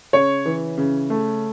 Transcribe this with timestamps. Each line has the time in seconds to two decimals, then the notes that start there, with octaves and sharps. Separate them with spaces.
0.13 C#3 C#5
0.45 E3
0.77 C#3
1.10 A3